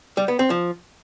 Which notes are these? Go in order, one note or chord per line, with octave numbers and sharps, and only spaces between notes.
G3
B3
C4
F3